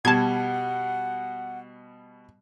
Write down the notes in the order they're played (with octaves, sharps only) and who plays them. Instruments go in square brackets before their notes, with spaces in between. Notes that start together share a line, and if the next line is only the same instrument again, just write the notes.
[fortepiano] B2 G3 [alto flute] F#5 [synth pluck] A5 G#6